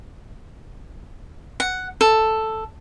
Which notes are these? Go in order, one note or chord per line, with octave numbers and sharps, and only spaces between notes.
F#5
A4